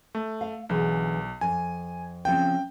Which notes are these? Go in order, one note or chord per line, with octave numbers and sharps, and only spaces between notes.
A3
F5
B1 D3 E3 G#4
F2 G#5
C#3 F3 C4 G5